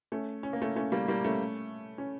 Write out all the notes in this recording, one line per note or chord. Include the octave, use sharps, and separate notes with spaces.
A3 C#4
C#4
A#3
A3 C#4
A3 C#4
G3 A#3
G3 A#3
A3 C#4
C#4